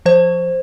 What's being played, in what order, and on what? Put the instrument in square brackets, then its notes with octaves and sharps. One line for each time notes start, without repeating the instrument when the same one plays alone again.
[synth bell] F3 C5